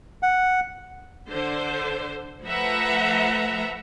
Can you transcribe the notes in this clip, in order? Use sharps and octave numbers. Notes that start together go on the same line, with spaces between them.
F#5
D3 C5
F3 A3 B4 E5 F#5 A#5